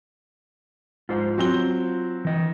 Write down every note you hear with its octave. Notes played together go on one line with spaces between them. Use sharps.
G#2 F4 C5
F#3 C4 G7
E3 D#5